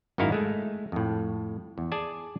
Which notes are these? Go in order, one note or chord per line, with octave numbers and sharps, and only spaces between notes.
G#1 F#2 D#3 D#4 E4 F5
G#3 A3
F2 A2
E2
G#4 D5 G#5 A5